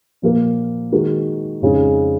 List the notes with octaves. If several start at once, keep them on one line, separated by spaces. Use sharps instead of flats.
A#2 F3 A#3 F4 A#4
D#3 G#3 D#4 F#4 A#4
F2 C#3 G#3 D#4 G#4